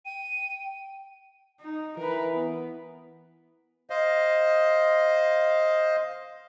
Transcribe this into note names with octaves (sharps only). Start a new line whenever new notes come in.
G5 D#7
D#4
E3 A#4 B4
B3
C5 D#5 F5